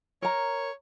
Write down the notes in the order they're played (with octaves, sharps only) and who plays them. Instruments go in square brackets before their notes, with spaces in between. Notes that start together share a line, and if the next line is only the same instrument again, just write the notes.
[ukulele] A#4 A#5 [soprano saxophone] C#5